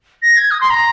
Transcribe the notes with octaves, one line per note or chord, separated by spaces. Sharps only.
A#6
G#6
D#6
C6
A#5